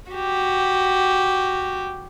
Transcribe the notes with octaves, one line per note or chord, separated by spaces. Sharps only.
F#4 G4